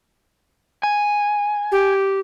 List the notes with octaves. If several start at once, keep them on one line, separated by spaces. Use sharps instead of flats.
G#5
G4